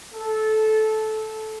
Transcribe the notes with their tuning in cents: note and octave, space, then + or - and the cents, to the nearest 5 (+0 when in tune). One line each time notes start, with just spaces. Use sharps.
A4 -15